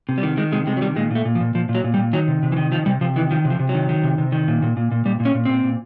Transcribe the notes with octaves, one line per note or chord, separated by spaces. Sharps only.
C3
G3
D#3
D#3 G#3
C3 G#3
C3 G#3
F#3
D#3 G3
A#2 G#3
A#2 A3
A#2
F3
A#2
A#2 F3
A#2
F#3
A#2
G3
A#2
D#3 F#3
C3
C3
E3
D#3
D#3 F3
C3 G3
C3 F3
D#3 E3
D#3 F3
C3
F3
C3
F#3
D#3
D#3
C3
C3
D#3
A#2
A#2
A#2
A#2
A#2 G3
A#2
C#4
A#2
A#2 C4
A#2